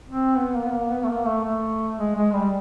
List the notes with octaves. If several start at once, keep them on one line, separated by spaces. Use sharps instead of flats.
C4
B3
A#3
B3
A#3
B3
A3
A#3
A3
A3
G#3
G#3
G3